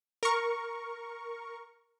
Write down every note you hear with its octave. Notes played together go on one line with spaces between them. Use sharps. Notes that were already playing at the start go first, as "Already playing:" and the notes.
A#4 C#6